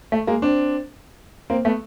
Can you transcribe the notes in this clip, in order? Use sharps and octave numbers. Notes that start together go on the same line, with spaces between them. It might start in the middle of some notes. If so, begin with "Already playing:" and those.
A3
G#3 A#3
C4 D4
A#3 C4
A3 B3